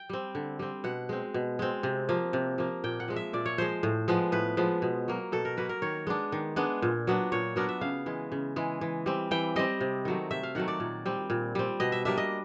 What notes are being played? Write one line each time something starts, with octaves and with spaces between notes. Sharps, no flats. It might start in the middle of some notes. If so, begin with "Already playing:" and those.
Already playing: G5
G3 C4
D3
G3 C4
B2 F#5
G#3 C4
B2
G#3 C4
C3
F3 A#3
C3
F3 A#3
A#2 G5
F#5
F3 G#3
E5
A#2 D5
C#5
F3 G#3 C5
A2
F3 G#3 B3
A2 B4
F3 G#3 B3
B2
F#3 A#3
B2 A4
A#4
F#3 A#3 B4
A#4
D#3 C#5
G#3 B3 D4
D#3
G#3 B3 D4
A#2
F#3 B3 D4
A#2 C#5
F#3 B3 D4 A#4
E5
C#3 F5
E3 G#3
C#3
E3 G#3
E3
G3 C4
E3 G5
G3 C4 D#5
C3
D#3 F#3 A3
C3 E5
F5
D#3 F#3 A3 F#5
D5
A#2
G3 C4
A#2
G3 C4
B2 D#5
E5
G3 A#3 D4 E5
D#5